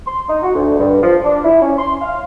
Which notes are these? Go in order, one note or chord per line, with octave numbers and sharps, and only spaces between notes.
C6
D#4
F#4
D2
G2
F3
D4
E4
C#4
C6
F5